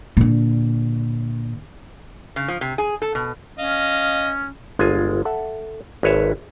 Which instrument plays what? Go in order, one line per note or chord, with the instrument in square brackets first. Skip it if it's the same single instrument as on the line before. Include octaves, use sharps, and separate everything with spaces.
[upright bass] A#2 D3
[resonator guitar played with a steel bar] C#3
F3
C3
G#4
A4
B2
[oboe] C#4 [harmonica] D#5 F5
[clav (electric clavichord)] G1 G#3 F4 G#5
A4 E5 F#5
G#1 B4 C#5 E5